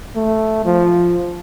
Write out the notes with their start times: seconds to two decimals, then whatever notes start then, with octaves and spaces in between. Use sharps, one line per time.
0.16 A3
0.65 F3